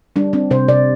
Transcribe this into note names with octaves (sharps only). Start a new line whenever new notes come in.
G3 D4
C4 D4
C3 C5
C3 D5